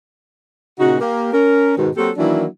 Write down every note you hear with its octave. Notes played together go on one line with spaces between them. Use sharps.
A#2 C#3 D#4 F#4
A#3 G4
C#4 A#4
G#2 B2 D#3
F#3 A#3 C4 F#4 G4 A4
D#3 E3 F#3 A#3 D4 E4